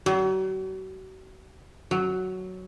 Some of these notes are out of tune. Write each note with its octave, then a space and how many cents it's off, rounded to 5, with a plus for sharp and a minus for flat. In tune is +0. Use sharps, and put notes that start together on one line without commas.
F#3 +40
F#3 +5